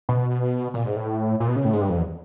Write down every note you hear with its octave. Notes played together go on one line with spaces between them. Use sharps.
B2
A#2
G#2
A2
A#2
B2
C#3
A2
G#2
G2
F2
E2